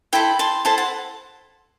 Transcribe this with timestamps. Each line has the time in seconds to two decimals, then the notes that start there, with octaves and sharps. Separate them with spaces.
0.13 E4 A4 C5 G5 B5
0.39 A5 C6
0.65 E4 A4 C5 A5 C6
0.78 F#5 A5